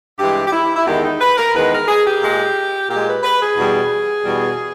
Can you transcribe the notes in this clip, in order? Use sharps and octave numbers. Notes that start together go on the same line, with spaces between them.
G2 E3 G#3 G4
G4
E4
E4
E2 D#3 G#3 G4
D#4
B4
A#4
E2 D#3 G#3 B4
A#4
G#4
G4
A#2 G#3
A#2 G#3 G4
B4
B4
G#4
E2 B2 G3
E2 B2 G3